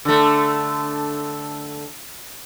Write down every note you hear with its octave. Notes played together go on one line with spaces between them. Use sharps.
D3 A3